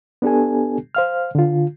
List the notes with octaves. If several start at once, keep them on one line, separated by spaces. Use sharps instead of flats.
B3 D4 G4 A4 G#5
C5 F5 F6
D3 F4